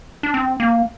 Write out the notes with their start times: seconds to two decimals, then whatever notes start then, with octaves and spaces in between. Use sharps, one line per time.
0.23 D4
0.34 C4
0.60 A#3